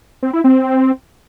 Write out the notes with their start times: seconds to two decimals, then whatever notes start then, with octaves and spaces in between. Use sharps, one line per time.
0.23 C4
0.33 E4
0.44 C4